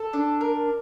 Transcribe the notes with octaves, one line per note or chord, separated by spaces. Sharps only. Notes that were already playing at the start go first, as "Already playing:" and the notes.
Already playing: A4
D4
A#4